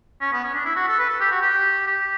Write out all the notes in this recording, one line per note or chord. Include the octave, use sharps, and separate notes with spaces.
C#4
B3
C#4
D4
E4
F#4
A4
B4
A4
G4
F#4
G4
G4